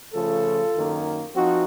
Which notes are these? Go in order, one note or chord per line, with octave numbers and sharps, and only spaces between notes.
C#3 F3 A3 F4 A4
F#2 D#3 A#3
F3 C4 D#4 F#4